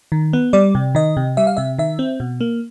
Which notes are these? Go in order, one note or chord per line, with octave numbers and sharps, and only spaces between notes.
D#3
B3
G3 D5
C3
D#3 D#5
C3
G3 E5
F5
C3 E5
D#3 E5
C4
B2
A#3